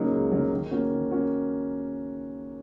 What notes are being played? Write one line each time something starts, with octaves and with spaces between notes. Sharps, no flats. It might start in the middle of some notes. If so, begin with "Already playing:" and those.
Already playing: C#3 F#3 A#3 D#4
C#2
C#3 F#3 A#3 D#4
D#3
A#3 C#4 F#4
D#3
A#3 C#4 F#4